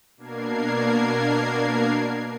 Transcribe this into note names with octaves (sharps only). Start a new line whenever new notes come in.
B2 A#3 D4 A#4 G#6 C7